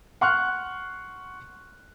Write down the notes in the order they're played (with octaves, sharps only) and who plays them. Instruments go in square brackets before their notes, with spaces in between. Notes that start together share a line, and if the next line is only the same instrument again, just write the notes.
[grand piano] F#5 C6 C#6 F6 F#6